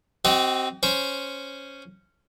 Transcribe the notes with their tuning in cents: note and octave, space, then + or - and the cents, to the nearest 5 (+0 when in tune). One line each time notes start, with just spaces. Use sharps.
C4 +0 F#4 +45 D#5 +0
C#4 +0 C5 +0